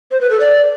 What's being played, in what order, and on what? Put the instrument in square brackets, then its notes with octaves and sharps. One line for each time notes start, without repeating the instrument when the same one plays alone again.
[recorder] C5
B4
A4
D5